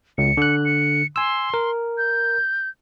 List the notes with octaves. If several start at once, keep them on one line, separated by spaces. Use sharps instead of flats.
C#2 C#7
D3 F#6
C#7
G#5 C6 E6
A#4
G6